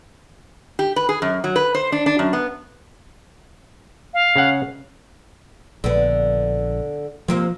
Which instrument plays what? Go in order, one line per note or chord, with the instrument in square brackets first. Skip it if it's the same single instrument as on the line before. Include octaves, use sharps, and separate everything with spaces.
[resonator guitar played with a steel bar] G4
B4
G#4
F#2
F#3
B4
C5
D4
D4
F#2
B3
[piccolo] F5
[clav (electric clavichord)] C#3 C#4 F#5
[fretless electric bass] A#1 [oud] D3 B3
[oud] C3 A#3 C4 [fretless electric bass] F3